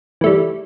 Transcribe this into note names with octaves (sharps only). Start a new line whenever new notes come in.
E3 G3 A3